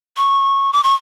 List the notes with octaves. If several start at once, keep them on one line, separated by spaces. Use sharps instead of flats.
C#6
D6
C#6